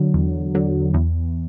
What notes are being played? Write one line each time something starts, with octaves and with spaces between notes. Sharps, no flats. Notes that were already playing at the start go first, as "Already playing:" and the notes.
Already playing: D3 F#3
E2
D3 F#3
E2